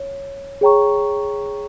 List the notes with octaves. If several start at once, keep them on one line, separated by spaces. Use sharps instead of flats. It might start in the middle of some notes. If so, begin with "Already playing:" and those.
Already playing: C#5
G#4 C#5 G5 A#5 C#6